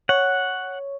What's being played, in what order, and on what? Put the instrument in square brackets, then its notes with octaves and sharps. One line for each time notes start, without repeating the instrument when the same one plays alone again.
[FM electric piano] C#5 [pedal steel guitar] F#5